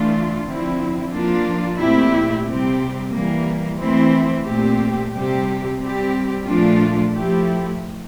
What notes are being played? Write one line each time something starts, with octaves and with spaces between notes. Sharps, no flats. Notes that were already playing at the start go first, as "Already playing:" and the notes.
Already playing: E3 A3 D4 F4
D3 F3 C4 E4
F3 A#3 D4 F4
A#2 A3 C4 E4 G4
C3 G3 C4 G4
E3 G3 A#3
E3 A3 C4 E4
A#2 A3 C4 G4
C3 G3 C4 G4
G3 C4 G4
A#2 F3 A3 D4 F4
F3 A3 E4 G4